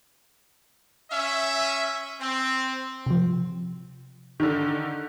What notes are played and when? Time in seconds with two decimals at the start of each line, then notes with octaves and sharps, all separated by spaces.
1.10 C#4 E5
2.20 C4
3.07 C3 F3
4.40 D3 D#3